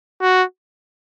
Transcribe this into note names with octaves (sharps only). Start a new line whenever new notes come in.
F#4